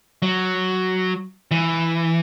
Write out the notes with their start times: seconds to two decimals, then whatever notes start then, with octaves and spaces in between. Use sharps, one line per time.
0.22 F#3
1.51 E3